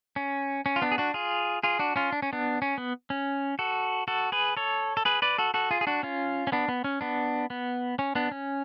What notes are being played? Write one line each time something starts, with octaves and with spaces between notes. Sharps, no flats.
C#4
C#4
F4
B3 D4
G#4
D4 F#4
F4 G#4
F4 G#4
D4 F#4
C#4 F4
D4
C#4
B3 D4
C#4
B3
C#4
F#4 A4
F#4 A4
G#4 B4
A4 C#5
A4
G#4 B4
B4 D5
F#4 A4
F#4 A4
F4 G#4
G#4
D4 F#4
C#4 F4
C#4
B3 D4
B3
C#4
B3 D4
B3
C#4
B3 D4
C#4